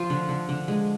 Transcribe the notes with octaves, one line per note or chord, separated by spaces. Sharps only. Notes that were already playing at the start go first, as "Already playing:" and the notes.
Already playing: F3 F4
D3
D3
D3
G#3